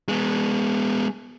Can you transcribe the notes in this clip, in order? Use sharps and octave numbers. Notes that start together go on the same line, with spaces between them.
G#3 B3